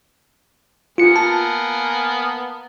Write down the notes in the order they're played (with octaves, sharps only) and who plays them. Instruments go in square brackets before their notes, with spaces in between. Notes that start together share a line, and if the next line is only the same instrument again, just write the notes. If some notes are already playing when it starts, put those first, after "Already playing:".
[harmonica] A#3 B3 G#5 [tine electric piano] F4 C#7
[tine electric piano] A5